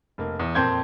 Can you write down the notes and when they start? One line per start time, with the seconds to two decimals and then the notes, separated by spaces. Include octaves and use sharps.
0.18 F1 A#3
0.39 E2
0.55 F2 A#2 C4 C6 G6 G#6